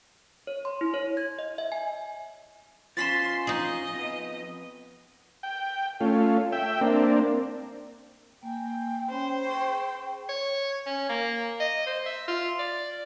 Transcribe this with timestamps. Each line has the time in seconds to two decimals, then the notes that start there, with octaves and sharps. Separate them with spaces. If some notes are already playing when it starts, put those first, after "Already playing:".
0.47 C#5
0.65 C6
0.81 E4
0.94 C#5
1.17 G#6
1.39 D#5
1.58 E5
1.72 G#5
2.97 F3 C#4 F4 C6 A6 B6 E7
3.47 D#4 G#4 D#5
3.94 F2 B3
5.43 G5
6.01 A3 C#4 F4
6.52 E5 G5
6.81 A#3 C4 D4
8.43 A#3 G5 G#5
9.10 C#4 C5 C#5 B5
9.45 G#4 G5 C#6
10.29 C#5
10.86 C#4
11.09 A#3
11.60 D#5
11.86 C5
12.06 E5
12.28 F4
12.59 D5